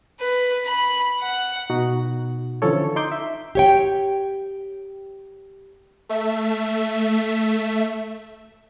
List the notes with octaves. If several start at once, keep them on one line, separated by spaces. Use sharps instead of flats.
B4
B5
F#5
B2 D#4 F#4
D3 E3 F3 C#4 A4 C#5
D#4 C6 D6 G6
E5
G4 C#5 G5
A3 E5